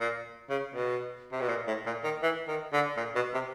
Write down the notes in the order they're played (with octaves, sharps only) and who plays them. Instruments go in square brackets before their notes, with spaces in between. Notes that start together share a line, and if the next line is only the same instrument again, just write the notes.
[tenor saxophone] A#2
C#3
B2
C3
B2
A#2
A2
A#2
D#3
E3
D#3
D3
A#2
B2
C3